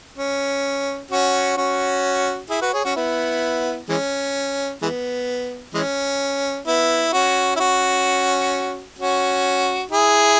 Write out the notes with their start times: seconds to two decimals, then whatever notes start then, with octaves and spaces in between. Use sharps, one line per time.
0.18 C#4
1.11 C#4 F#4
1.57 C#4 F#4
2.50 E4 G#4
2.61 F#4 B4
2.73 G#4 C#5
2.85 C#4 F#4
2.96 B3 E4
3.89 E3 G#3 C#4
4.82 E3 G#3 B3
5.74 E3 G#3 C#4
6.67 B3 E4
7.13 C#4 F#4
7.56 E4
7.60 C#4 F#4
8.99 C#4 F#4
9.91 E4 G#4